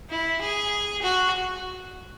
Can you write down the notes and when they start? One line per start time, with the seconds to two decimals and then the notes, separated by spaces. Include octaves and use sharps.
0.10 E4
0.41 G#4
1.02 F#4